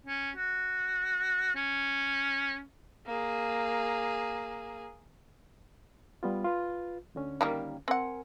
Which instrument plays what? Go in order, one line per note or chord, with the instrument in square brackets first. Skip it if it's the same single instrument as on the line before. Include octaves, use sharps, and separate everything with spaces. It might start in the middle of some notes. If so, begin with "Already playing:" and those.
[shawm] C#4
F#4
C#4
[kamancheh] A#3 G#4
[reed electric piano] G3 B3 F4
F4 B4
D2 D3 C#4
[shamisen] D#3 G3 A#3
[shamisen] C4 F#5 [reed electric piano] A#4 G#5